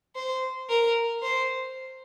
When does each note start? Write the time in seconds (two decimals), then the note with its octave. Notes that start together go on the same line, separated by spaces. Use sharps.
0.16 C5
0.69 A#4
1.23 C5